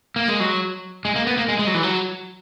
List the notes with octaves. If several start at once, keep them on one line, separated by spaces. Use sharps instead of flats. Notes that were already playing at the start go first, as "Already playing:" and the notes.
A#3
G#3
F#3
G#3
A#3
B3
A#3
G#3
G#3
F#3
E3
F#3